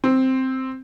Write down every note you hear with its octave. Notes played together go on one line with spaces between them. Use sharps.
C4